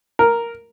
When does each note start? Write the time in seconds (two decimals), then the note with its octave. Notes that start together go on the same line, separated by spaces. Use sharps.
0.19 A#4